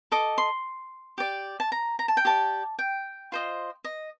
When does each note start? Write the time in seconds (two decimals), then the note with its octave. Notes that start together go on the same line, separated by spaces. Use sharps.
0.12 A4 D#5 D6
0.38 C6
1.18 G4 D5
1.60 A5
1.72 A#5
1.99 A#5
2.08 A5
2.17 G5
2.25 G4 D5 A5
2.79 G5
3.32 F4 C5 D#5
3.84 D#5